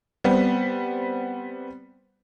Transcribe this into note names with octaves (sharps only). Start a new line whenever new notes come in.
G3 B3 C4